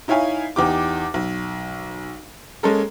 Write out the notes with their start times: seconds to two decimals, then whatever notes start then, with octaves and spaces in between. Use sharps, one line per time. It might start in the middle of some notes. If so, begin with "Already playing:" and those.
0.08 D#4 E4 C#5 F5 G#5
0.56 E2 D#4 G4 D6
1.14 B1
2.63 G#3 A#3 C#4 A4 A#4